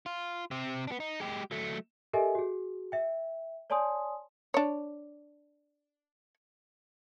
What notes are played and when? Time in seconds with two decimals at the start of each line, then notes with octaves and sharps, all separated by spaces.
0.06 F4
0.51 C3 C4
0.87 B3 D4
1.00 D#4
1.20 G#3 G4
1.51 F#3 A3
2.13 G4 A4 A#4 D#5 E5 G#5
2.35 F#4 G#4
2.92 E5 G5
3.70 C#5 D5 G#5 A5 C6 D#6
4.54 D4 C#5